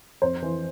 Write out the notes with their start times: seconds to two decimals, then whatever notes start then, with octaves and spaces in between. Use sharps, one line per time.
0.22 F2 C5
0.43 E3